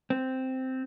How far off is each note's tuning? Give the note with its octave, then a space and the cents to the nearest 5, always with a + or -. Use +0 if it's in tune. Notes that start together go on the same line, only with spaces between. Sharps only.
C4 -5